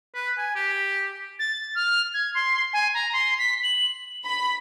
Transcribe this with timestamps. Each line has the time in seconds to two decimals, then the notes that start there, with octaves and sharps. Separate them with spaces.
0.15 B4
0.38 G#5
0.56 G4
1.39 A6
1.75 F6
2.14 G#6
2.34 C6
2.73 G#5
2.94 A#5
3.13 C6
3.38 B6
3.63 F#7
4.25 B5